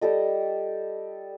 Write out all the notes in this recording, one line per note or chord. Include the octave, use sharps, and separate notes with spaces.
G3 G4 A4 D#5